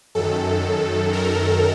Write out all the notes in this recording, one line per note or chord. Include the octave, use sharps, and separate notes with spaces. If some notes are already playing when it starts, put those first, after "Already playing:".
F#2 D#3 A4
A#4